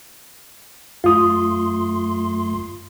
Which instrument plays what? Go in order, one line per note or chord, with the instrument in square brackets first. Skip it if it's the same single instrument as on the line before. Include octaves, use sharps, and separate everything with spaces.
[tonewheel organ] F#2 A3 C6 [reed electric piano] F4 D#6